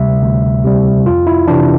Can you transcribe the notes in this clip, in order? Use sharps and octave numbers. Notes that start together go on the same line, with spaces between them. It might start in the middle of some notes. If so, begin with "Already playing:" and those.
Already playing: D2 C3 G3 E5
D2
C3 G3
F2 F4
E4
C3 E3 D4